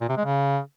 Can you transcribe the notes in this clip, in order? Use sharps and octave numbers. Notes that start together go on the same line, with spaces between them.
A#2
C3
G#3
C#3